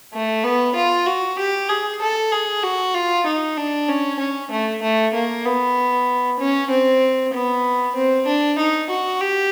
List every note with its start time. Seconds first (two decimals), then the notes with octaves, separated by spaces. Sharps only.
0.13 A3
0.44 B3
0.76 F4
1.07 F#4
1.39 G4
1.69 G#4
2.01 A4
2.32 G#4
2.63 F#4
2.95 F4
3.27 D#4
3.58 D4
3.89 C#4
4.19 C#4
4.51 A3
4.82 A3
5.14 A#3
5.45 B3
6.40 C#4
6.70 C4
7.33 B3
7.95 C4
8.27 D4
8.59 D#4
8.90 F#4
9.21 G4